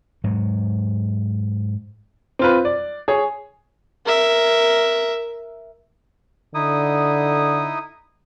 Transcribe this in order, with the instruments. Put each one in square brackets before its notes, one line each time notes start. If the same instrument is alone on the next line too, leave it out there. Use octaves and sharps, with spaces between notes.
[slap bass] G#2 F#3
[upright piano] C4 F4 B4
D5
G#4 C#5
[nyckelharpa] A#4 E5
[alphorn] D3 [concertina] D#4 E4 D#6